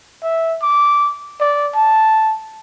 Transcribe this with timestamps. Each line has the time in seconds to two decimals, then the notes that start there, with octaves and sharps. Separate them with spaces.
0.23 E5
0.62 D6
1.40 D5
1.75 A5